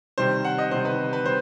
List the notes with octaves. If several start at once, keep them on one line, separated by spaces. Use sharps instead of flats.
C3 D#3 G3 C5
F#5
D#5
C3 D#3 G3 C5
B4
B4
G3 C5